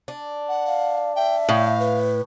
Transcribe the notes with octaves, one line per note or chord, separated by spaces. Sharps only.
D4
F#5
F5
E5 G5
A2 F5
B4